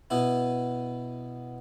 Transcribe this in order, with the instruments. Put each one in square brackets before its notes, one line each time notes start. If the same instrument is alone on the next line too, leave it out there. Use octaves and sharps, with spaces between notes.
[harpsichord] B2 B3 E4